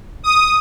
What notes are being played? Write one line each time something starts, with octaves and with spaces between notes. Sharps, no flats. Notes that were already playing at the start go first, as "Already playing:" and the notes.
D#6